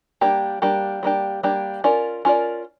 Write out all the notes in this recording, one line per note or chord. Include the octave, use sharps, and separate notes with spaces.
G3 A#3 D4 G4
G3 A#3 D4 G4
G3 A#3 D4 G4
G3 A#3 D4 G4
C#4 F4 A#4 D5
C#4 F4 A#4 D5